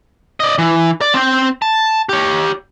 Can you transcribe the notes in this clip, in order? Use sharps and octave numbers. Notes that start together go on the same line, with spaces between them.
D5 D#5
E3
D5
C4 G5
A5
G4 C#5